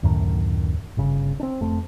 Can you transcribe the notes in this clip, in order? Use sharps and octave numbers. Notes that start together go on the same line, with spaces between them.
D1 F#2 A2 D#3
G1 C#3
C4 D4
F1 A3 C4